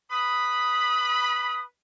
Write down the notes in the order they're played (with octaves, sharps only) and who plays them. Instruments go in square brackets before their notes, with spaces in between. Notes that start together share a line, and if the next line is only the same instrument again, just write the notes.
[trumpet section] B4 B5 [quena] D#6